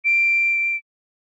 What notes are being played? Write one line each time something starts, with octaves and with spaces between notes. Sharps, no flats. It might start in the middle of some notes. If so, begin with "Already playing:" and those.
D7